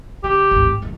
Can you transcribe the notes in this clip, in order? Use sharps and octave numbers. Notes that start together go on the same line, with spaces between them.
C#3 G4
G#1 D2
A2
F#1 D#2